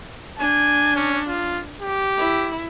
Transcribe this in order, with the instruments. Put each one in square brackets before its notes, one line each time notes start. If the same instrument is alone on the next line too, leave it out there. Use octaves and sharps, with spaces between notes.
[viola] D4 [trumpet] G#5
[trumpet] C#4
F4
G4
[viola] E4